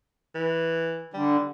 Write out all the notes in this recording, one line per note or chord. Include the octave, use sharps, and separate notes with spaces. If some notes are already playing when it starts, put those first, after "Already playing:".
E3
D3 G3